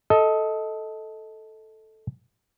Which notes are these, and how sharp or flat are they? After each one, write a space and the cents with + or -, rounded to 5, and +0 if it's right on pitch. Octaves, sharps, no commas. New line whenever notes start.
A4 -5 D#5 +20